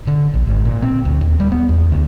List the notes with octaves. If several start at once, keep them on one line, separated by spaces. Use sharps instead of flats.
D3
A#1
G#1
A#2
C4
D2
D#2
G3
B3
E2
D2